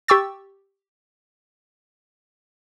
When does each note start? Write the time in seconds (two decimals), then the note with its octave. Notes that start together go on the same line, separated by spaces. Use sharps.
0.08 G4 G5 C#6 E6 A6